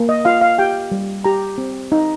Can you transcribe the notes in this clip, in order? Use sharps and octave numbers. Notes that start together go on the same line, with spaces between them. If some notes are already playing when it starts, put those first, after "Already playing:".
Already playing: A#3
D#5
F4 F5
F5
G4 G5
G3
G4 A#5
C4
D#4